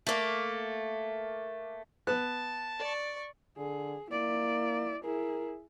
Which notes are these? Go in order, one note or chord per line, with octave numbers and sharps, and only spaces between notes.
A3 A#3
B3 A5 F#6
D5 C#6
D3 G#4
A#3 E4 D5
E4 G#4 A#4